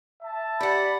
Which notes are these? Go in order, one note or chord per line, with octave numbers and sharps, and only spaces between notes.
E5 A5
G4 D5 F#5 B5